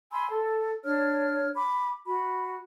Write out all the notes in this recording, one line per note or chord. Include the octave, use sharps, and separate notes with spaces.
G#5 B5 C6 E6
A4
D4 C#5 F6
B5 D6
F#4 B5